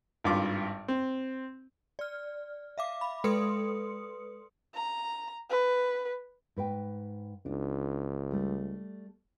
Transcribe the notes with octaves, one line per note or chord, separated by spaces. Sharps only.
G#1 G2 F4 D6
C4
D5 F6
E5 F5 D6
B5
G#3 A4 B4 C6 D#6 C#7
A#5
B4
G#2 B4 G5
C#2 D4
G3 A3